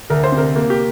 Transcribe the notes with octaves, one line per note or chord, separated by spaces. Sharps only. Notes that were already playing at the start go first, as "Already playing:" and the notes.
D2 A#4
C5
C3
A#4
A#3
G4